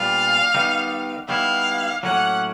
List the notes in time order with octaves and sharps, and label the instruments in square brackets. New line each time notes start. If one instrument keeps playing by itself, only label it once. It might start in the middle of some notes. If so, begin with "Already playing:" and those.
Already playing: [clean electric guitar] A#2 G3 B3 D4 F4 [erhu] F5
[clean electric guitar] D#3 G3 B3 D#4
[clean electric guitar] D#3 G3 B3 E4 [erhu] F5
[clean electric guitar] A2 F#3 A#3 C#4 [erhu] F#5